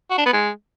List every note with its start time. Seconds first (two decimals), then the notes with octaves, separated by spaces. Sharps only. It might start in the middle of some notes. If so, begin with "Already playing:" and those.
0.10 F#4
0.18 D4
0.25 B3
0.33 G#3